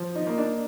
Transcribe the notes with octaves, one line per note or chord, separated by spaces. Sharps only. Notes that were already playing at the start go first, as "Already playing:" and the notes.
Already playing: F3
D#4
A#3 D#4
D4